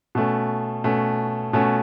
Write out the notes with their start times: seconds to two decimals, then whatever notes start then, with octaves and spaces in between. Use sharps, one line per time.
0.15 B2 A3 C#4
0.84 B2 A3 C#4
1.53 B2 A3 C#4